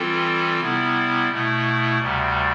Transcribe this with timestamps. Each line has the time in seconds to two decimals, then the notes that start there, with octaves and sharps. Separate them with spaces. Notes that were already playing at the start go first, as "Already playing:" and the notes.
Already playing: E3 G3 C4 F4 A4
0.60 C3 G3 B3 E4
1.30 B2 A3 E4
1.98 D2 C3 G3